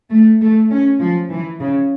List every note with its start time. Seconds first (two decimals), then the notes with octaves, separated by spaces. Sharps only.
0.10 A3
0.41 A3
0.70 C#4
1.00 F3
1.31 E3
1.60 C#3